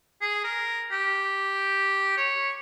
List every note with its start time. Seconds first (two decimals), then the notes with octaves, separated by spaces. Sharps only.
0.21 G#4
0.44 A#4
0.91 G4
2.17 C#5